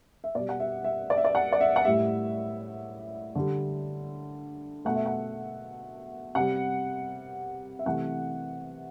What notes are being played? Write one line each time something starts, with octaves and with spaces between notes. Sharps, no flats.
E5
B2 G3 D5
F#5
E5
E5
D5
E5
D5
F#5
D5
E5
F#5
A2 G3 E5
D3 G3
B2 A3 F#5
E5
F#5
C3 G3 F#5
E5
C3 E3 A3 F#5